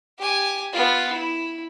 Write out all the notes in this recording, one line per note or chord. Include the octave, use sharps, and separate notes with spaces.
G4 G#5
B3 F4
E4